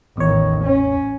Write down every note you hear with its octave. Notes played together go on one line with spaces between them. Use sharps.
A1 E2 D#3 C#5
C#4